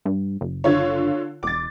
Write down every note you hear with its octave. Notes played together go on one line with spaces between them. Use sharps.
G2
F#1
D3 F4 C#5
E1 D6 A6